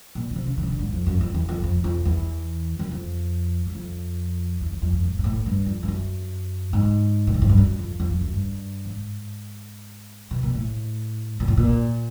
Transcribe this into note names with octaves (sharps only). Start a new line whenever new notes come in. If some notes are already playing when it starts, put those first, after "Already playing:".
A#2
C#3
C3
C#3
D#3
C#3
D3
G#2
F2
F#2
F2
E2
F2
F2
F2
E2
F#2
F2
F#2
F2
E2
E2
F2
F2
G#2
G#2
A2
G2
F2
G2
F#2
G#2
A#2
A2
G#2
G2
F#2
F2
F2
F2
F#2
G2
G#2
B2
A#2
A2
A#2
A2
A#2